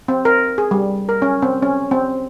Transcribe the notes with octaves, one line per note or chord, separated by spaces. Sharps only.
C4
A#4
G#4
G3
A#4
C#4
C4
C#4
C4